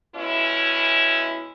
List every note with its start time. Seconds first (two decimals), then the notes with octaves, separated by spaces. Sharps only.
0.15 B2 G#3 C#4 E4